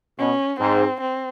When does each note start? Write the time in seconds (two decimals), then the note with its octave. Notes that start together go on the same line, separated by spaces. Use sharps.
0.19 B2 C#4
0.59 G#2 C4
1.00 C4